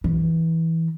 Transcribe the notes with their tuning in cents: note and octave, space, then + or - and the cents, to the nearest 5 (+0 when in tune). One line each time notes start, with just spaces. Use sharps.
E3 -15